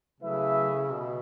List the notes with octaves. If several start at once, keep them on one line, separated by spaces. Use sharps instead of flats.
C#3 F#3 A3 E4 B4 E5
B2